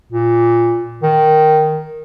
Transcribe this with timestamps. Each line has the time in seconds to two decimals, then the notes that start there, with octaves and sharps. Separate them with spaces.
0.12 A#2
1.03 D#3